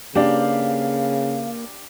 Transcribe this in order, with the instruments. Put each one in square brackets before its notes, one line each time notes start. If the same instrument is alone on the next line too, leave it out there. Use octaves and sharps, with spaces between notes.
[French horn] C#3 [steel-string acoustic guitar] A#3 B4 [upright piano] D4 G4 [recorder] F5